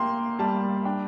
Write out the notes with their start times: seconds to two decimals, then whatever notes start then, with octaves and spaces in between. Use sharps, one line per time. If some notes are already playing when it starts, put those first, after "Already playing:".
Already playing: A#3 G4 G5 C6
0.39 G3 A5
0.85 D4 G5